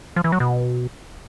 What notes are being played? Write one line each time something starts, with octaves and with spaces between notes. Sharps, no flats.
F3
E3
F#3
B2